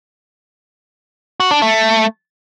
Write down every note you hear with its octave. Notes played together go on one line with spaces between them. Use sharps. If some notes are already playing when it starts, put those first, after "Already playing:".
F#4
D4
A3